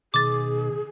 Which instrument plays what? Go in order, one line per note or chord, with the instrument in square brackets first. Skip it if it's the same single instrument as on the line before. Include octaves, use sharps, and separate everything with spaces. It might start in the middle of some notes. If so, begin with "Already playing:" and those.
[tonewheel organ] B2 D#3 [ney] G#4 [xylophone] D6 A6